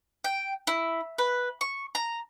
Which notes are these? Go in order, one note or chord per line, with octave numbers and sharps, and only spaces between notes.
G5
E4
B4
C#6
A#5